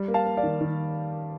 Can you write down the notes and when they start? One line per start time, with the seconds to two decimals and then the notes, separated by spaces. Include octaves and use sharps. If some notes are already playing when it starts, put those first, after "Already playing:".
Already playing: G3
0.08 A#3
0.14 F5 A5
0.26 A#3
0.37 D5 F5
0.43 D#3
0.61 D#3